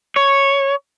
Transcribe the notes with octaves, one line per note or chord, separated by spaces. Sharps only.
C#5